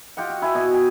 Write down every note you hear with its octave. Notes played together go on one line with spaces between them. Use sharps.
F4 G4 D#5 F#5
F#4
E4 E5 G#5
B2 D#5
G5 G#5